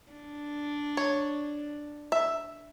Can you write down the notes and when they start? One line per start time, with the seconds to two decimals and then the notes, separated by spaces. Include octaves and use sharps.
0.12 D4
0.97 C#5
2.12 E5